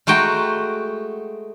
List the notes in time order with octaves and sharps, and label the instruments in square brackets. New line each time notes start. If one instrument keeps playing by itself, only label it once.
[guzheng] G#3 A3 F#4 G5 A#5